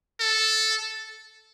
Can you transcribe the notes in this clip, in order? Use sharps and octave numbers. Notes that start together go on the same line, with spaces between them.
A4